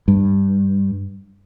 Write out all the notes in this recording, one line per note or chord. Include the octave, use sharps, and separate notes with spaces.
G2